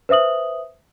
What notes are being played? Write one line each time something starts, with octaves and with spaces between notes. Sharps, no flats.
B4 C5 E5 D#6 F#7